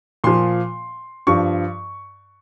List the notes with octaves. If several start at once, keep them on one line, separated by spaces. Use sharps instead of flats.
A#2 F3 C6
G2 F3 C#6